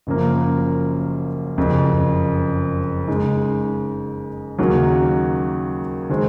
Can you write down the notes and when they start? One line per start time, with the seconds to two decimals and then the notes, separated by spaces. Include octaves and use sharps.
0.07 F#1 F#2 F3 A#3
1.57 F#1 F2 C#3
3.08 C#3 G#3 D#4
4.59 D#2 C#3 F#3 A#3 D#4
6.10 D#3 G#3 C4